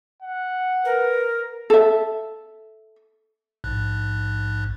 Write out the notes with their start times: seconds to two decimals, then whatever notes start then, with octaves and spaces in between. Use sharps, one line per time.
0.23 F#5
0.85 A#4 B4
1.70 A4 E5
3.64 A#1 G#2 F#6